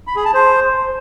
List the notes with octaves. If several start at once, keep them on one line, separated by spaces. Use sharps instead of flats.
B5
G#4
A5
C5